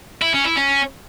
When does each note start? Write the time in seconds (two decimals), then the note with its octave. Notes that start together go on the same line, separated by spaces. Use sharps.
0.21 E4
0.33 C#4
0.44 E4
0.56 C#4